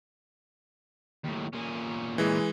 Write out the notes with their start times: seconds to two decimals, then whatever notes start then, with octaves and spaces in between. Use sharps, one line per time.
1.25 D#2 A2
1.53 A#2 C#4
2.18 E3 G#3